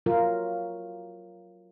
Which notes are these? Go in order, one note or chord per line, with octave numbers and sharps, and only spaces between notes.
F#3 F4 A#4